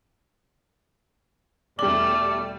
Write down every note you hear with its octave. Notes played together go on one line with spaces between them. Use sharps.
E2 B2 G3 A3 D5 D6 F#7